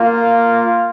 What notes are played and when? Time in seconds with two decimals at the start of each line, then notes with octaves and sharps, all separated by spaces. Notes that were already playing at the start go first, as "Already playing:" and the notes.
Already playing: A#3 F4